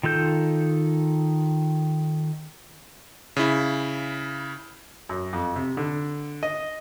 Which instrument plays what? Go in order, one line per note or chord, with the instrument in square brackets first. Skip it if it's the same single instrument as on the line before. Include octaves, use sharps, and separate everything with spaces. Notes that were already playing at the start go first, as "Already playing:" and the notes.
[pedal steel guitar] D#3 F4 A4 G6
[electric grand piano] C#3 E4
[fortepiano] F#2
F2
C3
D3
D#5